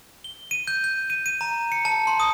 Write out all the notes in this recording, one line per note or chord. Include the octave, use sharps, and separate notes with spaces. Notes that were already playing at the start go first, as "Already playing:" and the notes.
G7
D#7
G6
G6
D#7
D#7
A#5
C#7
A5
C6
D#6